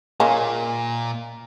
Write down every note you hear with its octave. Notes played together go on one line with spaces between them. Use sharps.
A#2 G#3 A#3 C#4